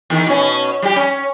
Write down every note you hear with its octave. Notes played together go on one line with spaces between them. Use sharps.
E2 D#3
B2 C#4
G3 G4
C#4